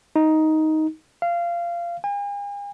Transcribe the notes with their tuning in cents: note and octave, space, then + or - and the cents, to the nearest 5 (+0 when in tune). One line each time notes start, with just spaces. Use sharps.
D#4 +10
F5 -20
G#5 -45